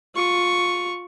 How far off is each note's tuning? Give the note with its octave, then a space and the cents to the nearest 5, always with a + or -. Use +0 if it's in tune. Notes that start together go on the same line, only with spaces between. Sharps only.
F4 +20 C#6 +0